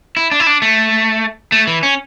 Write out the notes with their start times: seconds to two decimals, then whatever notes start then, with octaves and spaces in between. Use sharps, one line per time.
0.17 E4
0.31 D4
0.40 E4
0.47 D4
0.62 A3
1.52 A3
1.67 E3
1.83 C#4